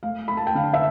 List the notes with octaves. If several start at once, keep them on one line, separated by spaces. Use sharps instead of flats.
A3 F5
A3 B5
A5
G5
D3 F5
E5